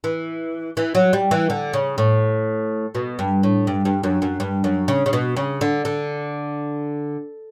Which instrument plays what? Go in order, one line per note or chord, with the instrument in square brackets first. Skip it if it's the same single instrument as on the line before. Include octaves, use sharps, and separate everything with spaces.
[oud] E3
E3
F#3
G3
E3
D3
C#3
A2
B2
G2
A2
G2
G2
F#2
F#2
G2
F#2
C#3
C#3
B2
C#3
D3
D3